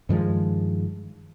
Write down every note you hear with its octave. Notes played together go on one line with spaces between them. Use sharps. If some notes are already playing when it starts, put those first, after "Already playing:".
G2 D#3 F3 G#3